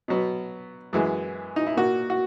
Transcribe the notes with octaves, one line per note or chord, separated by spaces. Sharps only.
B2 F#3 B3
F#2 E3 G#3
D#4
E4
A#2 A#3 F#4
F#4